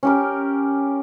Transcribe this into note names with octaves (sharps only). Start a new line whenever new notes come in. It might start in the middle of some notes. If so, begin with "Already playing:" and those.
C#4 G4 A#4